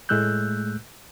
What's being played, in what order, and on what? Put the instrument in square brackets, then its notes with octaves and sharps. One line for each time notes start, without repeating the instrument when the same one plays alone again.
[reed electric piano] A2 G#3 A3 E6 F#6 G6